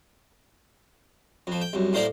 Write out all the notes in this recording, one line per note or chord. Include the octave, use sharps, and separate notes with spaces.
F2 F3
G5
C2 F#2
A2 A#3 C5 D5 A#5 C6